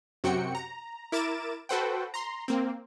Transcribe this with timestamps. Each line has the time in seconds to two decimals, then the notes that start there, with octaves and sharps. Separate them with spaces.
0.24 F#2 C3 F#4 G5 C#7
0.55 A#5
1.12 E4 A#4 D6 A6 D7 E7
1.69 F#4 A4 B4 C5 F#5 G5
2.14 A#5 C6
2.48 A#3 C4